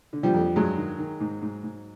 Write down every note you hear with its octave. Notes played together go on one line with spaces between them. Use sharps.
D3
F3 G3
F2
G2 F#3 G#3
D#3
D#3
G#2
G#2
G#2